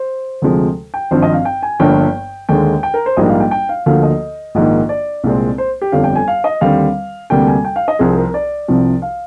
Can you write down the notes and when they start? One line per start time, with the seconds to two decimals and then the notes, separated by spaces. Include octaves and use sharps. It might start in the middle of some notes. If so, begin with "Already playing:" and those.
Already playing: C5
0.42 D2 C3 F3 G#3
0.94 G5
1.11 G#1 G2 F3 C4 C5
1.22 D#5
1.34 F5
1.45 G5
1.63 G#5
1.80 G1 G2 F3 A#3 G5
2.49 D#2 D3 G#3 G5
2.83 G5
2.94 A#4
3.06 C5
3.17 A#1 G#2 G3 A#3 D#5
3.29 F5
3.40 G5
3.51 G5
3.69 F5
3.86 D2 D3 F3 A#3 F5
4.03 D#5
4.55 A#1 G#2 D#3 A#3
4.89 D5
5.24 C2 A#2 G#3 C4
5.58 C5
5.82 G4
5.92 G1 F2 D3 G3 F5
6.04 G5
6.16 G#5
6.28 F5
6.44 D#5
6.61 D#2 D3 G3 C4 F5
7.30 D2 C3 G3 A#3 G5
7.47 G#5
7.65 G5
7.76 F5
7.88 D#5
7.99 C2 C3 F3 C4 G#4
8.16 A#4
8.34 D5
8.68 C2 C3 F3
9.02 F5